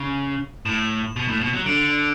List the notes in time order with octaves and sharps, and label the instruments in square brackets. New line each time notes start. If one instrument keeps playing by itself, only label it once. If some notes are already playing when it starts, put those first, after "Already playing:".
Already playing: [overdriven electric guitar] C#3
[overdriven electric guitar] A2 [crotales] E7
[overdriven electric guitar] B2
A2
B2
F#3
[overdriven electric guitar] D3 [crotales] D7